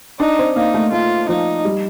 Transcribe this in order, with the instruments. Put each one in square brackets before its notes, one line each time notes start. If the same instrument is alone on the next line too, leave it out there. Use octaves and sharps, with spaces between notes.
[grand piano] D4 [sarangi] D#4
[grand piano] C4
[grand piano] A#3 [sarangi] D#4
[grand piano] A3
[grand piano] A3 [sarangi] F4
[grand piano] F3 [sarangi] D#4
[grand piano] G3